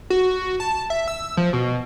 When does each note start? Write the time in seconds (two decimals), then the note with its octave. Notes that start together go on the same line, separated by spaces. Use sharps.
0.10 F#4
0.60 A5
0.90 E5
1.08 E6
1.37 F3
1.53 B2